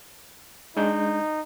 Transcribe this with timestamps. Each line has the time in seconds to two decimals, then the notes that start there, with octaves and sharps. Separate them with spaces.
0.77 G#3 D4 D#4 G6